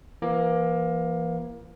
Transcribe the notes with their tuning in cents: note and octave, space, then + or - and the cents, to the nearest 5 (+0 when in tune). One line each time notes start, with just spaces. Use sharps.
E3 +40 A#3 +20